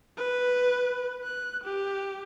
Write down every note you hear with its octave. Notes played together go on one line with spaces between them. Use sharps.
B4
F#6
G4